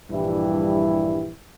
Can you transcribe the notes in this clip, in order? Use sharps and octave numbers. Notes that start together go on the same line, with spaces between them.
A#1 G2 E3 G3 E4